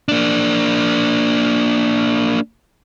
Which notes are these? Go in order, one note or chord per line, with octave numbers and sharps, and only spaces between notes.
A#3 D4